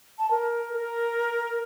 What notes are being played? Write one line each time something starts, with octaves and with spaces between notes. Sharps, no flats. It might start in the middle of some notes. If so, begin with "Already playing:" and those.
A5
A#4
A#4